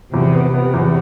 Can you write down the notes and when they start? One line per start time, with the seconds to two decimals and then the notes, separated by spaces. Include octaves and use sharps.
0.14 E2 C3
0.34 B3
0.54 C3 B3
0.74 E2